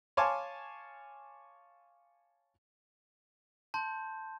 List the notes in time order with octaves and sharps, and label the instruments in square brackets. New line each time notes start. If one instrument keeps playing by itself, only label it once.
[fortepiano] C#5 F5 G#5 A5 C6 D6
[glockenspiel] A5 C6 G6